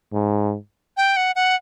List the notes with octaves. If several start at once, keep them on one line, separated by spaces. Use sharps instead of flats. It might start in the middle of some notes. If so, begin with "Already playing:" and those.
G#2
G5
F#5
F#5